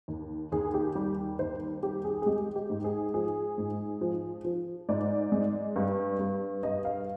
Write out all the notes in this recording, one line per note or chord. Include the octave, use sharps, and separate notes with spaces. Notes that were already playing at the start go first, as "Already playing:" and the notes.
D#2
D#2 G#4
G4
G3 G4
D#2 C5
G3 G4
G#4
G#4
G#3 G4
G4
G#2
G#4
F3 G#4
G#2
F3
F3
G#2 D5
G#3
G2
G2
G2 D#5
F5